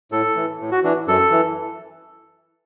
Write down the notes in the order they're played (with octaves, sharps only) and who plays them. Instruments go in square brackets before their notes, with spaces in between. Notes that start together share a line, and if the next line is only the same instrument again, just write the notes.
[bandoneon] A2 A4
E3
A2
F#4
E3 D4
F#2 A4
E3